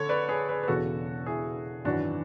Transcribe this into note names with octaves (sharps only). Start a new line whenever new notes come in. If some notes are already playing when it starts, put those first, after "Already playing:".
Already playing: D3 A4 C#5
B4 D5
G#4 B4
G#4 B4
B4
E1 E2 C#3 E3 F#4 A4
E4 G#4
G#1 F#2 E3 D4 F#4